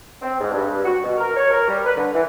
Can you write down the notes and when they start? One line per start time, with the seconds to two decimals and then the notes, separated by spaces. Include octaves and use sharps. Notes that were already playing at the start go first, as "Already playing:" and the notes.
0.22 C4
0.39 G#2
0.52 G2
0.85 F#4
1.04 B2
1.18 A#4
1.36 C#5
1.51 A#4
1.68 G3
1.86 B4
1.97 D3
2.14 E3